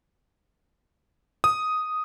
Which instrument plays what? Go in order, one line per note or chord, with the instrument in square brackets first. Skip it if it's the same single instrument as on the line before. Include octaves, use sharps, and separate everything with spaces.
[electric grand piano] D#6